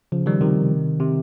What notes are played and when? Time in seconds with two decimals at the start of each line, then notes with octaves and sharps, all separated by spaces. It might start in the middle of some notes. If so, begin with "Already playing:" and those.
0.12 C#3 F3
0.26 D#3 G3
0.41 C3 D#3
1.00 C3